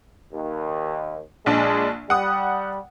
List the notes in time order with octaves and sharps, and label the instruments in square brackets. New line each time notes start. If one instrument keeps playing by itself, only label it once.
[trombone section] D#2
[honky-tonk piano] A#1 D4 [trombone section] G#3
[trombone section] G3 [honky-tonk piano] F#5 D#6